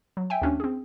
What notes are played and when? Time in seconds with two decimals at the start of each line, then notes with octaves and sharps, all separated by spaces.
0.17 F#3
0.30 E5 G5 G#5
0.42 D#2 C#4 D4
0.60 C4 G#4